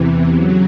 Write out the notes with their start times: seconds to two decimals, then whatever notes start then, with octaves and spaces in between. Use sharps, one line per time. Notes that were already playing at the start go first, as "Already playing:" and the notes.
Already playing: E2 C3 E3
0.34 C#3 F#3